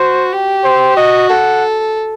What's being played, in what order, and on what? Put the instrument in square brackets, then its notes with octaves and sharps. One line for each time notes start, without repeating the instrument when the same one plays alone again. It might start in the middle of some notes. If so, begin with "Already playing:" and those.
Already playing: [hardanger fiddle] F#4 [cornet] C5
[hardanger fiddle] G4
[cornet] C5
[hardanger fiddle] F#4 [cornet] D#5
[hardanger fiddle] A4 [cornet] F#5